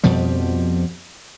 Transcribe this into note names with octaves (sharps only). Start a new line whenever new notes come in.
F2 B2 F3 G3